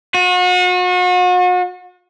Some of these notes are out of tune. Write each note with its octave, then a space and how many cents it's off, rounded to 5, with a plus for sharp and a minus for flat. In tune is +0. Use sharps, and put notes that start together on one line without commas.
F#4 -40